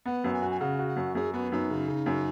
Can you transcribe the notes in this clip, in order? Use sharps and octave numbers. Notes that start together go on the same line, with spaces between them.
B3 F#5
F#2
G#5
F#4
G#5
C#3 F#5
F#4
F#5
F#2
F#2 G#4
B3 F#4
F#2 D#4
C#3
C#3
F#2